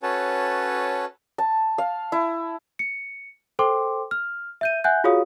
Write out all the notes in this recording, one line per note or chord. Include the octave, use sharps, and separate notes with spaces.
C#4 F#4 A4 B4 C#5 A5
A5
F5
E4
C#7
A4 C5 G5 C6 D6
F6
E5 G6 D#7
E5 F#5 G#5 F#6 G6
F4 F#4 G#4 C#5 F5 D#6